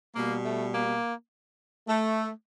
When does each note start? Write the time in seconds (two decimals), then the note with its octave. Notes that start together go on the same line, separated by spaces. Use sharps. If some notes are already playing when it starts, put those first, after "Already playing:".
0.16 B2 G3 A#3
0.45 A3
0.73 A#3
1.87 A3